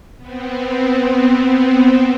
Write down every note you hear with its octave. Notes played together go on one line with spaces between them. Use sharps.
B3 C4